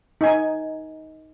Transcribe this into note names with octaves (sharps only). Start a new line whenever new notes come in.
D#4 G#5